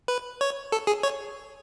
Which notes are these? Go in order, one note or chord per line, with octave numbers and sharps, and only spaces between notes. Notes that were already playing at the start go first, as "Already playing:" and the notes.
B4
C#5
A4
G#4
C#5